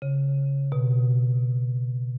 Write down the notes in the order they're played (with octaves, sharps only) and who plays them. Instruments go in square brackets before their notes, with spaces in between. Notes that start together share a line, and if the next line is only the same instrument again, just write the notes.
[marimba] C#3
B2